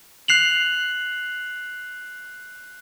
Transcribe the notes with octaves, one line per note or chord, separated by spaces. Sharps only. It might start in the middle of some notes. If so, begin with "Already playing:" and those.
F#6 C7 F7 F#7